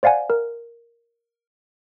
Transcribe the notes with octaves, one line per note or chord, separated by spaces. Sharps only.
C5 D5 F5 F#5 G#5
A#4